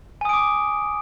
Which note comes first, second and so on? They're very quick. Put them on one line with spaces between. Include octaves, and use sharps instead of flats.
G#5 D#6 D7 D6